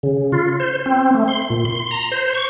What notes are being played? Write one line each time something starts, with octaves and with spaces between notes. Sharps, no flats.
C#3
F4
C5
C4
A3
C6
A#2
C6
A#5
C5
C#6